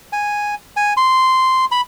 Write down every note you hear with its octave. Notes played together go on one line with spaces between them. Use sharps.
G#5
G#5
C6
B5